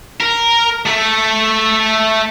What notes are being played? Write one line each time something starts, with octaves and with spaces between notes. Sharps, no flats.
A#4
A3